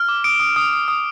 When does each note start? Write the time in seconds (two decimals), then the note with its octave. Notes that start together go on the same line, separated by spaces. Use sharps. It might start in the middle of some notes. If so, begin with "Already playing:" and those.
Already playing: F6
0.09 D6
0.24 D#6 D7
0.40 D#6
0.56 D#6
0.73 D#6
0.88 D#6